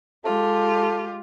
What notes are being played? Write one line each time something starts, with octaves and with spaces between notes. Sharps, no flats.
G#3 F4 G4 A4